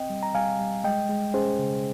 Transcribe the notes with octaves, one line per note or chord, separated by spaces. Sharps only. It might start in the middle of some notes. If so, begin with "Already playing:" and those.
Already playing: C4 D#5 G5
G3
A#5
G3 F5 G#5
G3
G#3 D#5 G5
G#3
C#4 G#4 C5
C#3